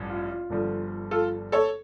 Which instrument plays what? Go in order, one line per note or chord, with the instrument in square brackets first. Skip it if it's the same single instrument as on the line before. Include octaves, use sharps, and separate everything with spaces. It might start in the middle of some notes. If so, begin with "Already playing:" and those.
Already playing: [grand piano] A1 G2 F3
F4
F4
G1 G2 D3 F3
F4 A4
A4 C#5